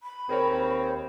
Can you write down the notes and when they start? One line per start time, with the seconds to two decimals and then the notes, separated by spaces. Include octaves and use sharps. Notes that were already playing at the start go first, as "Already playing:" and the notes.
0.03 B5
0.29 D#2 C4 G#4 A#4 C#5